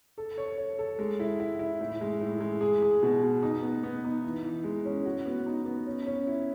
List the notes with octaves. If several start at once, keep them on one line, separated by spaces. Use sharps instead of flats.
A4
C#5
C#5
A4
G#3
E4
E4
E4
A2
G#3
A2
G#3
G#4
G#4
B2
B2
D#4
B3
B3
D#4
E3
E3
G#3
C#4
F#4
B3
D#4
B3
C#4
C#4
E4